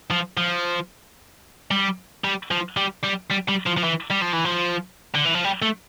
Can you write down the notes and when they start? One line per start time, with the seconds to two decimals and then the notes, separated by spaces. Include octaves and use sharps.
0.11 F3
0.37 F3
1.71 G3
2.24 G3
2.51 F3
2.77 G3
3.04 G3
3.31 G3
3.49 G3
3.67 F3
3.77 F3
3.84 E3
4.11 G3
4.22 F3
4.33 E3
4.45 F3
5.15 D3
5.25 E3
5.35 F3
5.44 G3
5.62 A3